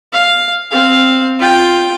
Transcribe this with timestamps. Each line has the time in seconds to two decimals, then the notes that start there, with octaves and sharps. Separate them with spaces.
0.13 F5
0.71 C4 F5
1.40 F4 G5